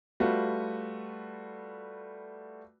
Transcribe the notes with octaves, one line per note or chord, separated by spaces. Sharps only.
G3 A3 F4 F#4 B4